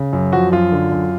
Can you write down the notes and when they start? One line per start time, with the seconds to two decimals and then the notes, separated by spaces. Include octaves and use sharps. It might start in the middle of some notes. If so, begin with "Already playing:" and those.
Already playing: C#3
0.13 F#2
0.33 F3 F#4
0.52 F#2 F4
0.72 D3
0.92 F#2